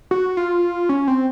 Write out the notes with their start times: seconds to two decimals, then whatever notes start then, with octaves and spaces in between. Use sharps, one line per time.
0.11 F#4
0.37 F4
0.89 C#4
1.08 C4